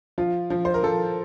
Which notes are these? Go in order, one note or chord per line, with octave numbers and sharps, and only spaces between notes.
F3 F4
F3
C5
A#4
F3 A4